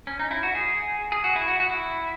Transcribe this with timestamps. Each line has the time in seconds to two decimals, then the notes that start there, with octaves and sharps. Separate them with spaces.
0.07 C#4
0.19 D#4
0.31 E4
0.43 F#4
0.55 G#4
1.12 G#4
1.24 F#4
1.36 E4
1.48 F#4
1.60 F#4
1.69 E4